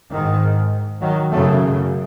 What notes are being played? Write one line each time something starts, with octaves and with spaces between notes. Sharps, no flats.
G#2 D#3
D#3 F#3
F#2 C#3 F#3 A3